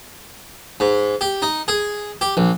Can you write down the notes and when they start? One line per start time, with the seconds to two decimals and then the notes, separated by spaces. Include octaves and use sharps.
0.80 G#2
1.21 G4
1.42 D#4
1.68 G#4
2.21 G4
2.37 A#1